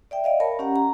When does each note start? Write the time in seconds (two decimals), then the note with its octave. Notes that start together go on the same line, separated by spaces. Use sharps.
0.11 D5 E5 G5
0.24 D5 D#5 F5
0.40 A#4 C#5 A5 B5
0.59 C#4 G4 F#5 A#5
0.76 A#5